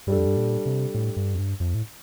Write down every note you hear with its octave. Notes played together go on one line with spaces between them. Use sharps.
G2 G3 D4 A4
F2
G2
A#2
C3
A2
G2
F2
G2
F2
A2